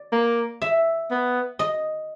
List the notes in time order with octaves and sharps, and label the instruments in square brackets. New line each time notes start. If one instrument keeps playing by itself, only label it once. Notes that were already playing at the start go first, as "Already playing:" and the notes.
Already playing: [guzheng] D5
[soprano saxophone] A#3
[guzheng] E5
[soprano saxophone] B3
[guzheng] D#5